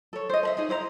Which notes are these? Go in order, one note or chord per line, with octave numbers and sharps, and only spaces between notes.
A4 C#5
C5 D#5
A4 E5
D#4 G#4 D#5
E4 C5 D#5 A#5